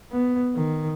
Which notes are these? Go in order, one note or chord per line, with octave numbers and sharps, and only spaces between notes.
B3
D#3